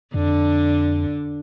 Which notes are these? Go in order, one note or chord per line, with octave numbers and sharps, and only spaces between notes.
F2 D3 D4